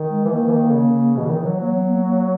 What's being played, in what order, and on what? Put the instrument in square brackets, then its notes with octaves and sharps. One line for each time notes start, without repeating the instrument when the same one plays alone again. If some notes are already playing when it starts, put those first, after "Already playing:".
Already playing: [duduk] D#3
[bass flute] G#3
[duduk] E3
[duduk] D#3 [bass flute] A#3
[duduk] E3
D#3
C#3
[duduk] B2 [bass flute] E3
[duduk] C#3
D#3
F#3
[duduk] F#3 [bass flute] A#3
[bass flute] B3
A#3
A#3